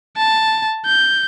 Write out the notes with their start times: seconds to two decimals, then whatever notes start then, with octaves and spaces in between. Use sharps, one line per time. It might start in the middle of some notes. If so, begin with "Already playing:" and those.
0.17 A5
0.86 G6